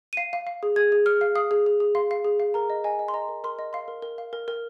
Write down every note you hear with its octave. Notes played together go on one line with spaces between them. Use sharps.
D#7
F5 C7
F5
F5
G#4
G#4 G#6
G#4
G#4 F6
F5
F5 D#6
G#4
G#4
G#4
F5 C6
F5
G#4
F5
A#4 A#5
D#5
D#5 G#5
D#5
C6
D#5 A#5
A#4
A#4 C6
D#5
F5 C6
A#4
A#4
F5
A#4
A#4